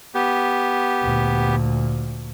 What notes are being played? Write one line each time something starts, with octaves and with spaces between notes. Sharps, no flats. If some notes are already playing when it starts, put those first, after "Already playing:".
B3 G4
D2 A#2